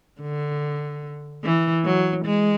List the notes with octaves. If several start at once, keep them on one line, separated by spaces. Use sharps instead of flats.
D3
E3
F#3
G#3